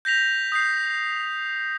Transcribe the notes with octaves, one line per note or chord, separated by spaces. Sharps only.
G6 A#6 B6 F7
D#6 G6 C7